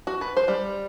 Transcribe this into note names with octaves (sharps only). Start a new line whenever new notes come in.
F#4
B4
C5
G3